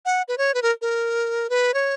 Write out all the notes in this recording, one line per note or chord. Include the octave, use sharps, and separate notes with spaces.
F#5
B4
C#5
B4
A#4
A#4
B4
C#5